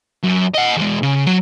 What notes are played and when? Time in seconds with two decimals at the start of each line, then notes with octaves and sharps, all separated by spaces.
0.24 F#2
0.55 D#5 F#5
0.77 E2 G#3
1.03 C#3
1.26 F#3